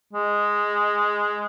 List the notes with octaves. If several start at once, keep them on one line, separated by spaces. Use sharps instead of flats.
G#3